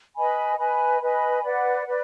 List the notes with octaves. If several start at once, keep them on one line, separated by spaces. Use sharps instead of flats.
B4 D#5 G#5 B5
B4 D#5 G#5 B5
B4 D#5 G#5 B5
B4 D5 F#5
B4 D5